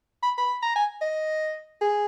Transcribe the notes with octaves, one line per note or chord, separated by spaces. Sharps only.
B5
B5
A#5
G#5
D#5
G#4